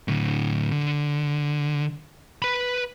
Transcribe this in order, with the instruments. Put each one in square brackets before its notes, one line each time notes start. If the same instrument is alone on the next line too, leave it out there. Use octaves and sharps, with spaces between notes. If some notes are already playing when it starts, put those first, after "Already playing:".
[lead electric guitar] A2 D3
D3
B4 B5